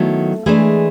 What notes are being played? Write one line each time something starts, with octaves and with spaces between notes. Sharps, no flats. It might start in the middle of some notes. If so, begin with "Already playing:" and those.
Already playing: D#3 F#3 A3 B3 E4 A4
E3 G#3 A3 D4 G#4